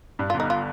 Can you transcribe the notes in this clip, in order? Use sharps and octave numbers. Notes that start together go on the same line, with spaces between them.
G2
F4
G1
D#4
F4